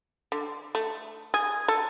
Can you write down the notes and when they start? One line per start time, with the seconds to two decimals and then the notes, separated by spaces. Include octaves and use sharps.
0.32 D3
0.75 A3
1.34 G#4
1.68 A4